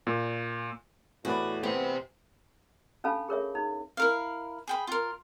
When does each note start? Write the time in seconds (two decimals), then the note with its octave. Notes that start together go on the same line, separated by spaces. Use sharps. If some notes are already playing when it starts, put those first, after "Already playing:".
0.07 A#2
1.25 E2 A2 F#4 B4 D5
1.63 B3 G4 C5
3.04 C#4 D4 A4 F5 A5 B5
3.28 G#4 A#4 C#5 E5
3.55 D#4
3.97 E4 A#4 F5
4.68 G#4 G5 B5
4.87 F4 A#4